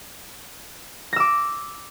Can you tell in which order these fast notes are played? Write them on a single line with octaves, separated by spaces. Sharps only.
A#6 E6 D6